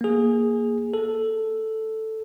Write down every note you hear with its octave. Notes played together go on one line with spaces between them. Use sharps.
A#3 G#4
A4